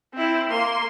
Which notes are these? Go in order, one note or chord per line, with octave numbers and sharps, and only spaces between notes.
C4 E4
A#3 C6